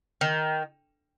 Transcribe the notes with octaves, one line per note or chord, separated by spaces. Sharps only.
D#3